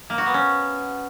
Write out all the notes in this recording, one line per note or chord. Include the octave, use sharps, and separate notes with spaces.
A#3
F#4
B3
C#4